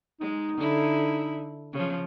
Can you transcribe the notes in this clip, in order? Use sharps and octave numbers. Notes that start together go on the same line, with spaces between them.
G#3 D#4
D3 E4
C#3 F3